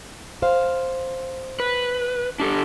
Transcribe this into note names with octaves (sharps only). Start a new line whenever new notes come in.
C5 F5
B4
D4 G4 A4